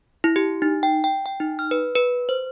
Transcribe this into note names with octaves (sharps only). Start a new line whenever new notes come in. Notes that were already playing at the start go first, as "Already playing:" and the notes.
E4
G4
D#4
G5
G5
G5
D#4
F6
B4
B4
C5